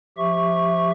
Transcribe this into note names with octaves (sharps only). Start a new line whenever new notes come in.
F3 G4 E5 C#6